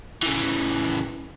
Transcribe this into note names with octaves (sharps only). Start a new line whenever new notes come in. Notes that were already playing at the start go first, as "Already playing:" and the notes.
C#3 E3